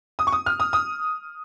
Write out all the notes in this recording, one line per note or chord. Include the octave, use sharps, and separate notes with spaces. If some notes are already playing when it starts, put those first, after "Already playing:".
D#6
C#6
D#6
F6
D#6
D#6